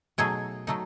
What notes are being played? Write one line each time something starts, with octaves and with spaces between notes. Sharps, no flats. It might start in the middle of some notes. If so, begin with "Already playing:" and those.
B2 F#3 A3 D#4 G#4
F#3 A3 D#4